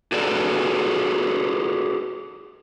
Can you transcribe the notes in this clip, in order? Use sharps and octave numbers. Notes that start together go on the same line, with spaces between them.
F#4 G#4 A4 B4 D5